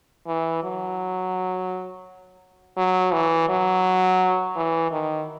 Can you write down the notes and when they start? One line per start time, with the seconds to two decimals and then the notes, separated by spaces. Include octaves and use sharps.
0.27 E3
0.64 F#3
2.78 F#3
3.13 E3
3.49 F#3
4.57 E3
4.92 D#3